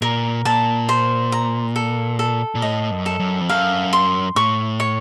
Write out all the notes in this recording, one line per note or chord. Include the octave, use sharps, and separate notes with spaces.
A#2 A#4
A#2 A5
C5
A#5
A4
A4
A#2
A2 D#5
F#2
A4
F#2
F2
F#2 F5
C6
A2 C#6
C#5